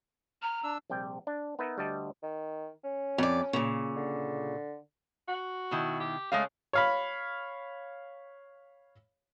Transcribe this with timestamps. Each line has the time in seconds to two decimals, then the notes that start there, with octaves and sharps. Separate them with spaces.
0.42 A#5 F6
0.64 D4 E6
0.90 A#1 C3 G3 G5
1.27 D4
1.59 B3 D#4 A#4 B4 D#5 E5
1.78 D2 G3 D5 D#5 A5
2.23 D#3
2.84 C#4
3.18 F2 D5
3.53 A#2 C#3
3.96 D3
5.28 F#4
5.71 B2 D#3 E4
6.00 G4
6.32 C#3 G#3 A3 F5
6.73 C#5 F5 B5